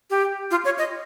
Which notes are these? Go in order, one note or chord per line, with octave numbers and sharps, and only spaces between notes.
G4
F4
C#5
D#5